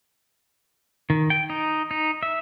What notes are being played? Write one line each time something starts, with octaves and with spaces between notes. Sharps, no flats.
D#3
G5
D#4
D#4
E5